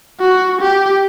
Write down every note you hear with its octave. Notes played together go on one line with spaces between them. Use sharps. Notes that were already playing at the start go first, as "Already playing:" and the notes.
F#4
G4